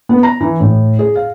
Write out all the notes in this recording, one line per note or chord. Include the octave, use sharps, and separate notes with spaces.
B3
A#5
E3
A2
G#4
F5